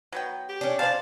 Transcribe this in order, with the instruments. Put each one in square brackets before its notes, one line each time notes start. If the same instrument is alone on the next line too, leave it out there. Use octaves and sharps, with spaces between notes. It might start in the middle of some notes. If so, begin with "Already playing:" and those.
[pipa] F#3 B3 G5
[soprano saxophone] G4
[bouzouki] C#4 D4
[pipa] C#3 C5 D5 [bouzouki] F5 [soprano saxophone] A5